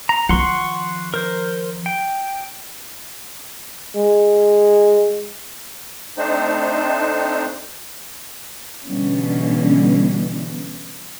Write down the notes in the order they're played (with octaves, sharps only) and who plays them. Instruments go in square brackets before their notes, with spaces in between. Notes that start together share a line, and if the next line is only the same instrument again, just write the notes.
[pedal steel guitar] A#5
[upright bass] D#3 F3 [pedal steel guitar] F#5 C6 C#6
[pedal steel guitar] A#4 C5
G5
[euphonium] G#3
[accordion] A3 C4 D4 D#4 C5
[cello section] B2 D3 E3 G3 B3 C#4